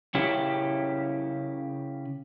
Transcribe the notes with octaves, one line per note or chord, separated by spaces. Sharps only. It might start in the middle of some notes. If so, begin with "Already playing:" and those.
C#3 C#4 E4 G4